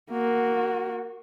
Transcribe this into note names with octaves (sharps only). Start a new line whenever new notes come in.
A#3 F#4